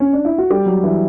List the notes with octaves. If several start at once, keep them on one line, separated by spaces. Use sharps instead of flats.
C#4
D4
E4
F#4
G3 G4
F#3 F#4
E3 E4